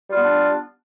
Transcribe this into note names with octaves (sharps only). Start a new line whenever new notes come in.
G3 B3 D4 F4